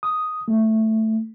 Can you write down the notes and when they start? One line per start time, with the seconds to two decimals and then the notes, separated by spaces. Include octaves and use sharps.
0.03 D#6
0.48 A3